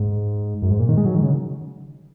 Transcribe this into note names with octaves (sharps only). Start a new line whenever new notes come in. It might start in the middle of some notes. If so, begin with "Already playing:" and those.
Already playing: G#2
F#2
G#2
A#2
D#3
G#3
F#3
D#3
C#3